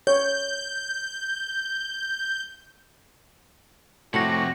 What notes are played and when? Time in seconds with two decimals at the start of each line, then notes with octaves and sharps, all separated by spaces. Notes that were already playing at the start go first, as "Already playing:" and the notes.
0.07 C#5 G6
4.14 F2 A2 C3 F#4 A#6 C#7 F#7